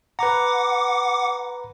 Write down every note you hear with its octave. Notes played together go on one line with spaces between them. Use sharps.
B4 F#5 A#5 D6